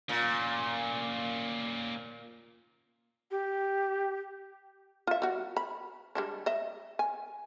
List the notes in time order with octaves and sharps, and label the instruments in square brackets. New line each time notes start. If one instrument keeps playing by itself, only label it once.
[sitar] A#2 [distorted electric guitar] A#3 C#4
[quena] G4
[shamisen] F4 E5
G3 F#4
B5
G3 G#3 D4
D#5 E5
G#5